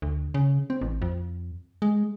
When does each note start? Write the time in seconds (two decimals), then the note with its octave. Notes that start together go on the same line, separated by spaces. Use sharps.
0.02 D2
0.34 C#3
0.70 C4
0.81 A1
1.02 F2
1.82 G#3